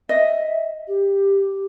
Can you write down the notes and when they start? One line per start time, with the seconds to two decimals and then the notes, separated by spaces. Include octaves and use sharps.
0.09 D#5 E5
0.88 G4